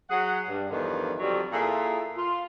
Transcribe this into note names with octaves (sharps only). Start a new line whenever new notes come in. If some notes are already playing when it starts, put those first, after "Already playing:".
F#3 G#4 F#5
G2
E2 G2 D3 D#3 F3
F2 D3 F#3 G3
A#2 E4 F4 G#4 A4
F4